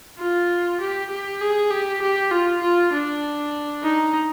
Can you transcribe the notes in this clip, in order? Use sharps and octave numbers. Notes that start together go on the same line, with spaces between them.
F4
G4
G4
G#4
G4
G4
F4
F4
D4
D#4